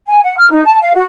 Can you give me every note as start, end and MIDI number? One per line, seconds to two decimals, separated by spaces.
0.07 0.19 80
0.23 0.36 78
0.37 0.47 89
0.50 0.62 63
0.64 0.78 81
0.81 0.92 77
0.94 1.03 66